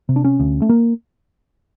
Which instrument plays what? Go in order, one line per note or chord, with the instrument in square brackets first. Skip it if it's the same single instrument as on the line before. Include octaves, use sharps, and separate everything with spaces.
[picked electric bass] C3
D4
C#4
D2
A3
A#3